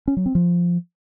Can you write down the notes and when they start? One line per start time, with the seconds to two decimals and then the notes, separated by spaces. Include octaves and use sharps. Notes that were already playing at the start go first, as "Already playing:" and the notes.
0.08 C#4
0.17 F#3
0.26 C4
0.35 F3